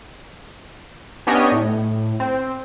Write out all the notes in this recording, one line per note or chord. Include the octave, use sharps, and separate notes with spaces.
B3 C#4 D4 G4 C#5 D#5
A2
C4